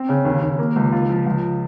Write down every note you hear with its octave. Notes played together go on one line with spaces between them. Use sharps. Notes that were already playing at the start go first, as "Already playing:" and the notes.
Already playing: C4
C#3
D#2
D#2
A#3
C#2
F4
F3
C#2